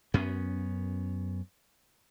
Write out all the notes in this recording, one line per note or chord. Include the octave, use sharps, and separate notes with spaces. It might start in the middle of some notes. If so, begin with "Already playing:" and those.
F#2 B3 C#4